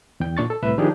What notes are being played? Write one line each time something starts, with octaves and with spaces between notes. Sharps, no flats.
E2 G5
A#2 D4 C#6 A6
A4
C2 A2 B4 E5 E6
D#3 F3 D4 D#4 G4 G#4